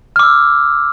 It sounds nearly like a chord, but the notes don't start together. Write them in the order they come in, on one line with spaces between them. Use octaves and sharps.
F6 D6 E6